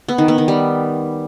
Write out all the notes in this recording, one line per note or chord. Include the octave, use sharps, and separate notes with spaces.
B3
D#3
B3
D#3
G3